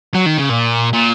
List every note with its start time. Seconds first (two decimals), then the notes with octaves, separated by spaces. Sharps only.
0.14 F#3
0.26 D#3
0.38 C#3
0.50 A#2
0.93 A#2